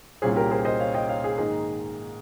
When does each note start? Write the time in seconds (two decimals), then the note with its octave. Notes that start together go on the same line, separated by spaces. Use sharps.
0.22 C2 A#2 G3 C#4 G#4 C5
0.36 G4 A#4
0.51 G#4 C5
0.65 C5 D#5
0.80 C#5 F5
0.94 D#5 G5
1.09 C#5 F5
1.24 G#4
1.38 G#2 D#3 A#3 D#4 G#4